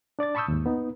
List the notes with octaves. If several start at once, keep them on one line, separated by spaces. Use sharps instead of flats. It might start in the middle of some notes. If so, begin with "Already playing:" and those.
D4 D5 D6 A6
A5 B5 C#6 D#6 E6 G6
D#2 G#2
B3 D#4